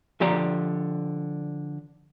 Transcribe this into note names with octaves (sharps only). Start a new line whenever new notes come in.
D3 F3 G4 D5 A#5